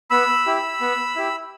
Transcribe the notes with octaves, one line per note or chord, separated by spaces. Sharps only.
B3 B5 E6
E4 G4
B3
E4 G4